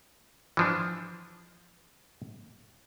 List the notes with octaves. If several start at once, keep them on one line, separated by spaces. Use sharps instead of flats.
E3 F3 D4